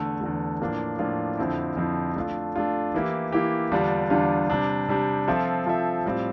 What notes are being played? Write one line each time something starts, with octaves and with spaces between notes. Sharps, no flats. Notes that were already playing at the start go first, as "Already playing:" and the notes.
Already playing: E2 D3 A3
E2 D3 A3
A2 F3 A#3 D4 F4
A2 F3 A#3 D4 F4
F2 D3 F3 C4 E4
F2 D3 F3 C4 E4
A3 D4 F4
A3 D4 F4
E3 A#3 E4 G4
E3 A#3 E4 G4
E2 D3 G3 D4 F4
E2 D3 G3 D4 F4
C3 G3 D4
C3 G3 D4
F3 C4 F4 A4 E5
F3 C4 F4 A4 E5
A2 G3 C4 F4